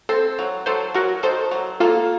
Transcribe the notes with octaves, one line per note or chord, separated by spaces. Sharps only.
C4 A4 C5
F#3
F#3 A4 C5
F#3 F#4 A#4
D#3 A4 C5
F#3
A#3 F4 A4